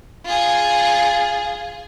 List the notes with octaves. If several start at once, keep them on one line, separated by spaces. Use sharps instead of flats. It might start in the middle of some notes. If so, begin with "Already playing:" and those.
F4 G#4